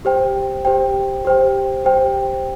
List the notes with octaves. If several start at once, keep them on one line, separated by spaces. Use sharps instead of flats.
G4 C5 G5
G4 C5 G5
G4 C5 G5
G4 C5 G5